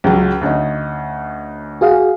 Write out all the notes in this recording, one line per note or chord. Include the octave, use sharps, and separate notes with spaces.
C#2 C#3 F#3
D2 C#4 D#4
F#4 G#4 F5